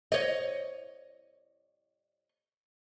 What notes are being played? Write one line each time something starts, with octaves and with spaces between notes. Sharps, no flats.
C#5 D#5